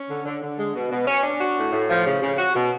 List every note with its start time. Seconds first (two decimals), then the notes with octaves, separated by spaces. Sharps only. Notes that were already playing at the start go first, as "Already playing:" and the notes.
Already playing: C#4
0.09 D3
0.25 D3
0.42 D3
0.59 G#3
0.75 B2
0.91 B2
1.07 C#4
1.23 D4
1.40 F#4
1.57 A2
1.72 A2
1.90 F3
2.06 C#3
2.23 C#3
2.38 F#4
2.55 B2